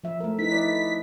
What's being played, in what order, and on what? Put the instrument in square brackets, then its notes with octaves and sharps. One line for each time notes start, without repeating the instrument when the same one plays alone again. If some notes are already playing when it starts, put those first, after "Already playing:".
[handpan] F3 E5
A3 A#4
[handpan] D#4 E4 B4 [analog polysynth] B6
[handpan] E4 D5 D#5